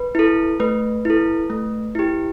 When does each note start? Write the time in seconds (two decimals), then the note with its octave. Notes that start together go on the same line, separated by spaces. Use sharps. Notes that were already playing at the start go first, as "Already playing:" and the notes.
Already playing: B4
0.15 E4 A4
0.60 A3 B4
1.05 E4 A4
1.50 A3
1.95 E4 G4